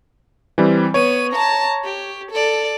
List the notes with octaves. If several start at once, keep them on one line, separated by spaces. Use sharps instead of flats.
E3 G3 C4
B3 C#5 D#7
A5 A#5
G4
A4 D5